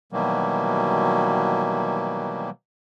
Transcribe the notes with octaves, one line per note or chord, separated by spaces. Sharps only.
B2 D#3 E3 F#3 G3 A#3